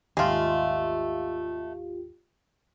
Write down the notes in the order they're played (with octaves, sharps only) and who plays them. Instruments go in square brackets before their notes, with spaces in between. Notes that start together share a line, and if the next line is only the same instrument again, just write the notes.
[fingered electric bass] G#1 D#2 [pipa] G#3 A3 [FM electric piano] F4 G4